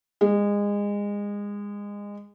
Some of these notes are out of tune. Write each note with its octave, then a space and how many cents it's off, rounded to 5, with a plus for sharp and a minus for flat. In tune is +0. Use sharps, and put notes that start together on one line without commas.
G#3 -25